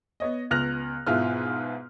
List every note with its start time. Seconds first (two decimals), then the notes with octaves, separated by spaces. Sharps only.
0.20 B3 C#5 D#5
0.51 C#2 B3 F6 F#6 A#6 F7
1.07 G#2 B2 E4 F4 B4 F6